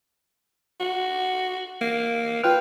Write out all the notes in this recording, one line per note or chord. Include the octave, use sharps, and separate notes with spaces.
F#4
A#3
F4 B4 G5 F6